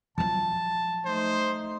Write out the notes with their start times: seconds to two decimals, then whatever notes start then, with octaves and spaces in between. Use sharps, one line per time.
0.18 F3 F#3 A5
1.05 A3 D#4 C5